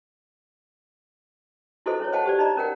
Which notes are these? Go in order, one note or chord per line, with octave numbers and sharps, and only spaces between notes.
E4 F#4 G#4 A4 C5 D#5
C#4 E4 C#5
C5 D#5 F#5 G5 A5
G4 C5 D5
D#4 D5 D#5 A#5
C#4 A#4 F#5 G5